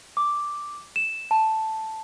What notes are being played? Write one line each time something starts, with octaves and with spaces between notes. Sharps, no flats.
D6
E7
A5